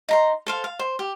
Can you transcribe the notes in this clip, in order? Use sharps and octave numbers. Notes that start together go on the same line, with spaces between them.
D#4 A#5 C6
A4 C5 F5
F5
C5
G4